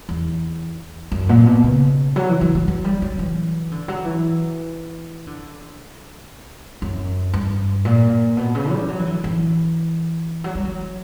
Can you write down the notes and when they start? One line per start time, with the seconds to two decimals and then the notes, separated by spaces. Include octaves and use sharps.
0.09 E2
1.12 F#2
1.29 A#2
1.46 B2
1.64 C#3
2.16 F#3
2.29 E3
2.41 E3
2.55 F#3
2.68 F#3
2.84 G3
3.02 F#3
3.19 E3
3.71 D3
3.88 F#3
4.05 E3
5.27 D3
6.82 F#2
7.33 G2
7.85 A#2
8.37 B2
8.55 C#3
8.72 G3
8.88 F#3
8.99 E3
9.06 D3
9.24 E3
10.44 F#3
10.55 G3
10.65 F#3